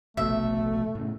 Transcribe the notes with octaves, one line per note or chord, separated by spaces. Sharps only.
F1 A#1 B2 A3 E5
A2 C#3